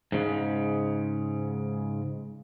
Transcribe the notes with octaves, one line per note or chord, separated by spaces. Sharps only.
G#2 C#3